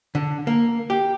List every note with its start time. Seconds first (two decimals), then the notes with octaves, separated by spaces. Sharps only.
0.15 D3
0.47 A#3
0.90 G4